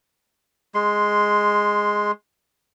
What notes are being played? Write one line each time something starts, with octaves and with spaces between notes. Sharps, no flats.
G#3 C6